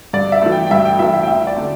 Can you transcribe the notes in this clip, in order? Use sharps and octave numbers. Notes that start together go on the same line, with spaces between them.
G2 D5
E5
E3 A3
G5
G5
G2 E5
G5
E3 A3 E5
E5
G5
E2 E5
D5
D3 A3